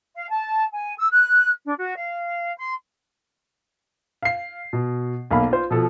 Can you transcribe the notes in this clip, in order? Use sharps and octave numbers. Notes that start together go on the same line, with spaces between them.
F5
A5
G#5
E6
F#6
D4
F#4
F5
C6
F5 C7
B2
B1 A#3 F5 B5
F4 C5
B2 F3 A4